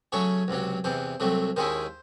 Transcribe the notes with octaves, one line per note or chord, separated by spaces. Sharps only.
C#3 F#3 A3 C#4 C#5
C#2 C3 F#3
E2 C3 E3 C5
C2 C3 F#3 A3
D#2 D#3 G#3 C#4 E4 C5